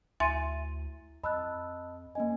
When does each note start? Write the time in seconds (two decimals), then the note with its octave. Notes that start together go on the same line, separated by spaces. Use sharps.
0.20 D2 E4 E5 G#5 C6 A6 D#7
1.24 F2 D#5 A5 B5 E6 F#6
2.15 A#3 C#4 D#5 G#5